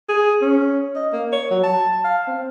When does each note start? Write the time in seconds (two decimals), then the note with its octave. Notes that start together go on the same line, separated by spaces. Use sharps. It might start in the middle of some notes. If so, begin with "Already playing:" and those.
0.09 G#4
0.42 C#4
0.96 D#5
1.13 A#3
1.32 C#5
1.51 F#3
1.64 A5
2.04 F5
2.27 C4